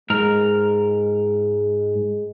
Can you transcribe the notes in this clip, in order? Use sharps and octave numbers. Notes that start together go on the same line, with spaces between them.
G#2 G#3 A#4